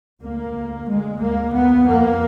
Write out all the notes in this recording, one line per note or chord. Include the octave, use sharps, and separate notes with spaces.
D2 A#3
D2
D2 G#3
D2 A#3
D#2 B3
F2 A#3